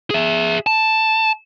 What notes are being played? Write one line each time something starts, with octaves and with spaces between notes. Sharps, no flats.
G#4 E5
A5